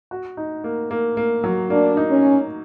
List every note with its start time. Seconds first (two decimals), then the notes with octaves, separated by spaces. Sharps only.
0.11 F#4
0.37 D#4
0.64 A#3
0.91 A#3
1.17 A#3
1.44 F#3
1.70 A#3 D4
1.97 D#4
2.10 C#4
2.23 F#4